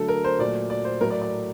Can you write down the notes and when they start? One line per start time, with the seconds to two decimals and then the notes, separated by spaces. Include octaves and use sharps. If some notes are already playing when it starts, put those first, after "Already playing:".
Already playing: D3 F#3 A3 A4
0.08 A#4
0.24 C5
0.39 A#2 F#3 A3 D5
0.70 D5
0.85 C5
1.01 A2 F#3 A3 A#4
1.11 D5
1.22 D5